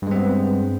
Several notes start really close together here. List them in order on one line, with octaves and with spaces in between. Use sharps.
G2 G#3 C4 B3